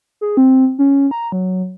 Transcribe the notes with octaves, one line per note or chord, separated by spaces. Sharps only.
G#4
C4
C#4
A#5
F#3